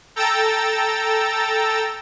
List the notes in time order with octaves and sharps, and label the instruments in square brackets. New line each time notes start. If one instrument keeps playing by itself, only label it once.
[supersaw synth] A4 G5 A#5 E6 A6